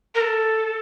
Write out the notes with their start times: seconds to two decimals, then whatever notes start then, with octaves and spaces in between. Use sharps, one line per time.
0.15 A#4
0.21 A4